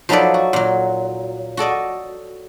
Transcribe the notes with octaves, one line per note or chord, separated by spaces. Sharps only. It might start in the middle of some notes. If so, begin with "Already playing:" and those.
F3 F#3 D#4 A4 B4 D5
F#4
A#2 F#3
F#4 A4 D5 D#5